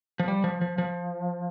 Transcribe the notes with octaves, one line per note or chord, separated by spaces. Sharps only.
F3
G3
F3
F3
F3